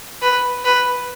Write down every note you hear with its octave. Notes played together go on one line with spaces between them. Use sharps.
B4
B4